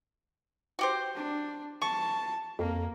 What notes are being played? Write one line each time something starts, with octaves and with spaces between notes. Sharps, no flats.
F#4 G4 C5
D4
A5 C#6
F2 A#3